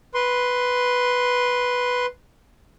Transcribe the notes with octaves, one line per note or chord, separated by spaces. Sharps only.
B4 C6